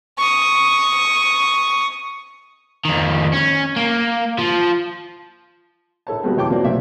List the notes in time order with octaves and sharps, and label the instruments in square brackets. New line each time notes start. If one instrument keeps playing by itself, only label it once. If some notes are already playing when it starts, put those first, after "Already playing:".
[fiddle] C#6 D#6
[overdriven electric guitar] F2 D#3
C#4
A#3
F3
[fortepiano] A#1 A4 C#5 A5
G3 G#3 A#3 B3 F#4
E2 B2 C#5 G5 A5 D6
F3 A#3 F#4 C5 D5
B1 C3 A3 A#3 C5 E5